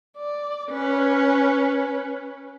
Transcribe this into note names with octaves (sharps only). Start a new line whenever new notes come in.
D5
C#4 B4